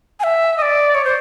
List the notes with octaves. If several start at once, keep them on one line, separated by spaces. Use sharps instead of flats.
G#5
E5
D#5
D5
C#5
C5